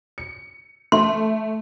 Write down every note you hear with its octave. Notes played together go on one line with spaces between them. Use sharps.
C#7
A3 C6